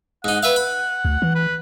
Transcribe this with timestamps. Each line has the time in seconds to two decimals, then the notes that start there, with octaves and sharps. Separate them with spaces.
0.24 G#2 D#4 F#5
0.43 B4 E5 F5
0.56 B5
1.05 D2
1.22 E3
1.35 B4